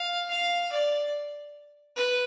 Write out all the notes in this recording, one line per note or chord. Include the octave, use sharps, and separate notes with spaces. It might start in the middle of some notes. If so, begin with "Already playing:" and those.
Already playing: F5
F5
D5
B4